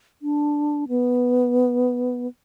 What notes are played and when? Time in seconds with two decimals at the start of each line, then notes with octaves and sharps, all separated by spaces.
0.22 D4
0.89 B3